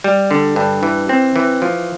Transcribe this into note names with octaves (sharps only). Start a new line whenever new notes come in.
G3
D3
G2
E3
C4
E3
F3